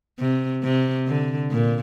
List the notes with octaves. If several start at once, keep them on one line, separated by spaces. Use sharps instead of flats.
C3
C3
D3
A#2